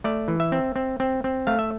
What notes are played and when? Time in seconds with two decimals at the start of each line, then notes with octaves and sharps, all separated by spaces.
0.04 A3 D5
0.28 E3
0.40 E5
0.52 C4
0.76 C4
1.00 C4
1.24 C4
1.47 A3 F5
1.59 E5